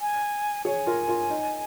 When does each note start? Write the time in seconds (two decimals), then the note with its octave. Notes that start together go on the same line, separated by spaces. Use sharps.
0.01 G#5
0.65 G#4 C#5 G#5
0.87 F4 A#4
1.08 F4 A#4
1.30 D#4